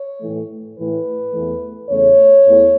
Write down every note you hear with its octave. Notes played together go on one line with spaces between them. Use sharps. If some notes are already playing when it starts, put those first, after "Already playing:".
Already playing: C#5
A2 E3 A3
A2 E3 A3 B4
E2 E3 A3
E2 C#3 A3 C#5
E2 E3 A3